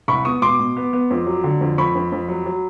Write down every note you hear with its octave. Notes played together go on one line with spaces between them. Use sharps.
C2 B5 C#6
B3 C#6 D#6
B2 C6 D6
B2
B3
B3
F2
F#3
D3
F2
F2 B5 C#6
F2
F2
F#3
F#3